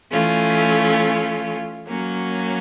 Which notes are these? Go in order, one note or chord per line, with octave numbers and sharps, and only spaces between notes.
E3 A3 C#4 F4
F#3 A#3 C#4 F#4